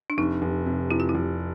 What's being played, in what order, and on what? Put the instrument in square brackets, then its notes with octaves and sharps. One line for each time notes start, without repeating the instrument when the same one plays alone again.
[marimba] D4
[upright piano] F1 [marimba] D#4
[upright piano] F1
C3
[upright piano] C3 [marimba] E4
[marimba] F4
E4
[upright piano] F1